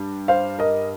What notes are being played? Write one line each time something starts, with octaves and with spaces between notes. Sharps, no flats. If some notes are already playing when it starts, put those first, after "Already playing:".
Already playing: G2
C5 F5
A#4 D#5